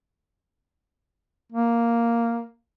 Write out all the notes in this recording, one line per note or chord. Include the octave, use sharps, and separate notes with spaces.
A#3